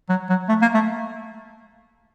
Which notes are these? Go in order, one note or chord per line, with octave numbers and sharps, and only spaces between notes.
F#3
F#3
A3
A#3
A3